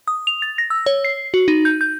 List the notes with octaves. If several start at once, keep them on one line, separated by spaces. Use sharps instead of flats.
D#6
F7
A6
A#6
E6
C#5
C7
F#4
D#4
G6
G6